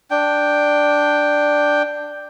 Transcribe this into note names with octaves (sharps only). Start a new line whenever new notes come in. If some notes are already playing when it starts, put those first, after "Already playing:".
D4 G5